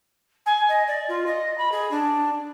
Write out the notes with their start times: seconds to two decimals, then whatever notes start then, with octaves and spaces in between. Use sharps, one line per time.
0.46 G#5
0.68 D#5
0.87 D5
1.08 F4
1.26 D#5
1.58 B5
1.71 G#4
1.91 D4